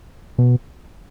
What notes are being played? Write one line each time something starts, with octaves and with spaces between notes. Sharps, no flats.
B2